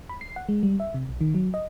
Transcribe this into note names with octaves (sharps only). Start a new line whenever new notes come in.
B5
C7
F#5
G#3
G3
E5
C3
B1
D#3
F#3
D#5